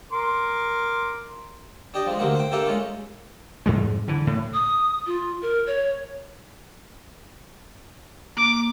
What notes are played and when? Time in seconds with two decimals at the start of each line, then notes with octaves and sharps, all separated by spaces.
0.12 A#4 C6 D6
1.94 D4 G4 D#5
2.06 F3 G#3
2.19 D2 C3 A#3 F#4
2.35 C5 G5
2.52 A#3 D4 G4 A4 E5 F5
2.66 G#3 C#4 F4
3.66 F2 G#2 G3 G#3
4.08 D3 E3
4.27 A2
4.54 D#6
5.07 F4
5.42 A#4
5.67 C#5
8.37 A#3 D6